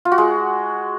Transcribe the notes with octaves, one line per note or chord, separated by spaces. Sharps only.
F4
F#4
G#3